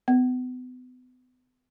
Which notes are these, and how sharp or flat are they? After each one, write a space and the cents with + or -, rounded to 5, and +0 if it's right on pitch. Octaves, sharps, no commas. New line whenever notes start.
B3 +35